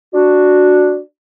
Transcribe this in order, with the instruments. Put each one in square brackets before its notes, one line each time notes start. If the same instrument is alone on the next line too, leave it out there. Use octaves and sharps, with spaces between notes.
[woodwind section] D4 F#4